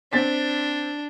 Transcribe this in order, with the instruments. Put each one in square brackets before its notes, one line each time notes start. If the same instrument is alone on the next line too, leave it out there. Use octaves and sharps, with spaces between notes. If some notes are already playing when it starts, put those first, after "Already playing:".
[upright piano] C4 A6 B6 [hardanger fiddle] D4